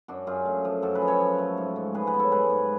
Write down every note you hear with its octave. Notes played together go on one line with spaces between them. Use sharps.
F#2 D4 F#4
F#2 F4 G#4
A3
F3
F#2 F#4 A4
G#4 B4
F3
A4 C#5
F3
A3
G#2
G#2
G#2 G#4 B4
G#4 B4
B3
A4 C#5
G#2 G#4 B4
G#2